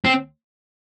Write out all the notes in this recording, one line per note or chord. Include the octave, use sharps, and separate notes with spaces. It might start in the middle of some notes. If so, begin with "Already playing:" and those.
C4